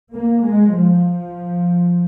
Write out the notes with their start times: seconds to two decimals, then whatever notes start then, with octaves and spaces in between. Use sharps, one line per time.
0.13 A#3
0.44 G#3
0.72 F3